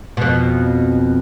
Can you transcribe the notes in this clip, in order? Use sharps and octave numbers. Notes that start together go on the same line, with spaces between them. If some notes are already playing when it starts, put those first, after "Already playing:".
F2 B2